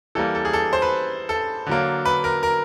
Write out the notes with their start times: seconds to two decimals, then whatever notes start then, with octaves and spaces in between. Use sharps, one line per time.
0.15 E3 G3 A#3 A4
0.35 A4
0.45 G#4
0.53 A4
0.73 C5
0.82 B4
1.29 A4
1.67 D3 F#3 A#3
2.05 B4
2.24 A#4
2.43 A#4